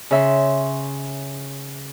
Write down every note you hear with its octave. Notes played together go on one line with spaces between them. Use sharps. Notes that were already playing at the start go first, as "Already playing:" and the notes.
C#3 E5 C6